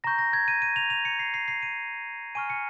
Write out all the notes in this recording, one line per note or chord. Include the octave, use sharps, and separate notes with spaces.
A#5 C#6 G6 A#6
A#6
G#6
D#7
D#7
F7
F7
C#7
C7
C7
C7
D#7
G#5 C#6 F6 D#7
C#7